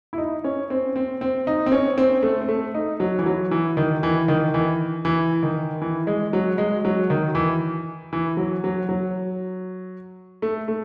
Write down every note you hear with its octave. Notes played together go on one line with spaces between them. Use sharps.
E4
D#4
C#4
C4
C4
C4
D#4
C4
C#4
C4
A3
C4
A3
D#4
F#3
E3
F#3
E3
D#3
E3
D#3
E3
E3
D#3
E3
G#3
F#3
G#3
F#3
D#3
E3
E3
F#3
F#3
F#3
A3
A3